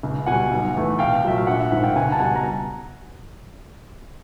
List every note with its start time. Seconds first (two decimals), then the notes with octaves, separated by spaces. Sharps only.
0.03 C#2
0.26 B2 G3 F#5 G#5
0.51 B1
0.75 A2 E3 A3
0.99 C2 F5 G5
1.24 A#2 F#3 A3 E5
1.38 F5
1.47 A#1 E5 F#5
1.59 E5 F#5
1.71 G#2 D#3 E5 F#5
1.83 F5 G5
1.96 C#2 F#5 G#5
2.12 A5
2.19 B2 G3 F#5 G#5
2.36 A#5